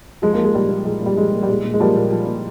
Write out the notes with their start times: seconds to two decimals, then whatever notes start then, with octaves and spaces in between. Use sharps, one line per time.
0.22 F3 G#3
0.33 F3 A#3
0.44 G#3
0.54 A#2 G3
0.69 A#2
0.85 F3 G#3
1.02 A#2 G3
1.17 F3 G#3
1.32 A#2
1.43 G3
1.48 A#2 G#3
1.65 A#2
1.74 G#3
1.80 F3 G3 A#3
1.96 A#2
2.12 F3
2.27 A#2